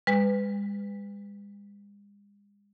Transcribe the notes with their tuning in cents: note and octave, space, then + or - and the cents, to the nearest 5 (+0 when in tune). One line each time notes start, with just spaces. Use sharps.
G#3 -45 B4 +20